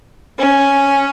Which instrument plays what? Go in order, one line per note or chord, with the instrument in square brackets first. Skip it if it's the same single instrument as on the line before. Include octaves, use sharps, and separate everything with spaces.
[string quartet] C#4